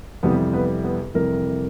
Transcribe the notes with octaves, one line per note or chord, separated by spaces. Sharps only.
F2 C3 E3 G3 B3 B4
B3 B4
B3 B4
F2 C3 E3 G3 A#4